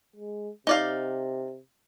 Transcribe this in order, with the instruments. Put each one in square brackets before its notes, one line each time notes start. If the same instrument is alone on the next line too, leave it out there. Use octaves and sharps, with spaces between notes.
[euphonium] G#3
[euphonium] C3 [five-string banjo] D#4 D5 F5